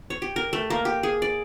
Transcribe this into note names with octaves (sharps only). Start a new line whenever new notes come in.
C#5
G4
A#4
A3
A#3
G4
G#4
D5